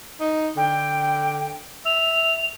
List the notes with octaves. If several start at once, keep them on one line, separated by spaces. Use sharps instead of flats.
D#4
D3 G5
E5 F7